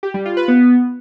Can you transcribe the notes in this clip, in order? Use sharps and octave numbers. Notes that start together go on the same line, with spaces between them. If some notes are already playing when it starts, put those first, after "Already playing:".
G4
G3
F4
B4
B3